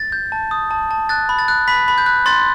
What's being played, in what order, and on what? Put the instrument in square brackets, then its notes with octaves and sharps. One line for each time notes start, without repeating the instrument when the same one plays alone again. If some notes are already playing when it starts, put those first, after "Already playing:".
Already playing: [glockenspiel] A6
G6
A5
D#6
A5
A5
F#6 A6
B5
A6
F#6
B5 B6
B5
G6
F#6
C6 A6